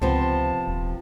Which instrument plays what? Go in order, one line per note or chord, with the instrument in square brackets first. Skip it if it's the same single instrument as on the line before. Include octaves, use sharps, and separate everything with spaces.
[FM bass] C#2 [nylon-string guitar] C3 F3 B3 [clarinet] A5
[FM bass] D#1